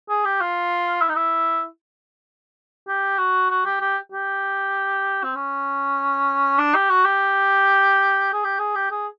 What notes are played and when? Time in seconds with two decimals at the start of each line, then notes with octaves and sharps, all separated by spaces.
0.09 G#4
0.24 G4
0.41 F4
1.02 E4
1.09 D#4
1.16 E4
2.88 G4
3.18 F#4
3.50 F#4
3.65 G4
3.81 G4
4.12 G4
5.24 C4
5.35 C#4
6.59 D4
6.74 G4
6.90 F#4
7.05 G4
8.33 G#4
8.44 G4
8.59 G#4
8.75 G4
8.91 G#4